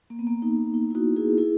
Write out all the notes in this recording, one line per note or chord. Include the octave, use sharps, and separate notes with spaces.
A#3
B3
A#3
D#4
D#4
E4
D#4 F#4
E4 G#4
E4 G#4